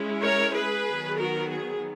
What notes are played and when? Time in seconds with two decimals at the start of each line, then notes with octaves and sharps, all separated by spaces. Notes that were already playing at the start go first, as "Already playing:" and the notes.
Already playing: G#3 C#4 E4
0.23 A#4 C#5
0.55 G#4 B4
0.87 D#3 F#3 B3
1.19 F#4 A#4
1.51 G#4